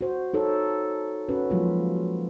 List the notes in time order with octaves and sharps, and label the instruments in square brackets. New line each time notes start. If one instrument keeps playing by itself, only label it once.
[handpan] F#4 C5
D#4 A4 C#5
C#4 F#4 B4
F3 F#3 G#3 A#3 F4